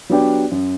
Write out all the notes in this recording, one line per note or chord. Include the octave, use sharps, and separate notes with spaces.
F#3 B3 D4 G4
F#2